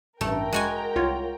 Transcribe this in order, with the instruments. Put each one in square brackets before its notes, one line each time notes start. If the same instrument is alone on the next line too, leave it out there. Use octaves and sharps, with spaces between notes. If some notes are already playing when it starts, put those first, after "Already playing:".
[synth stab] A1 G2 [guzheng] A3 [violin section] A#4 G5 A#5
[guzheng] G#3 F#4 G#5
[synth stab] C2 F4 C#5